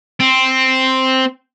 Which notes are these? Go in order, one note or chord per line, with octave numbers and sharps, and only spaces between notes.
C4